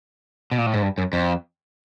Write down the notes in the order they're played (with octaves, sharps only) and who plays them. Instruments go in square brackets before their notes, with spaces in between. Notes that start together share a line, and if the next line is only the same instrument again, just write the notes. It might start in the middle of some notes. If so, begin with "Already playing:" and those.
[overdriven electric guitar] B2
A#2
A2
G#2
G2
F#2
F2